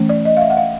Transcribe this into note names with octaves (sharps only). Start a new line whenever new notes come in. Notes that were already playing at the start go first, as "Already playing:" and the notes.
Already playing: E3 A3 C#4
D5
D#5
F5
E5
F#5
F5